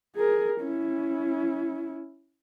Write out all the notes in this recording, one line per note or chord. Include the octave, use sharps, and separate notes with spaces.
G#4 A#4
C#4 E4